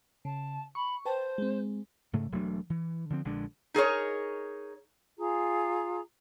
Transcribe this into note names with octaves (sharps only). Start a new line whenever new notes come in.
C#3 A5
B5 C#6
B4 C5 G5 A5
G#3 C4
G#2 C#3 A3
E1 F#3 A3 D4
E3
D3 F3 C4
A#1 D3 G#3 D4
D#4 G#4 A#4 C#5
F4 G#4 A#5